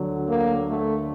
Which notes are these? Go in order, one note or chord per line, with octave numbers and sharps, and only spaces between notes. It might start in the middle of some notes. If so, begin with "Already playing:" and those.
Already playing: D2 D3 F#3
A#3
A3